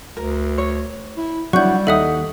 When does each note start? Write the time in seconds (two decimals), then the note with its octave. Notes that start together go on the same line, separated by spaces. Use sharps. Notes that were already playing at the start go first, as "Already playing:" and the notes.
0.17 D2 A#4
0.58 C#5
1.18 E4
1.53 F#3 G3 D4 E4 F#5 C#6 G6
1.87 D#2 D#4 A4 E5 F#5 D#6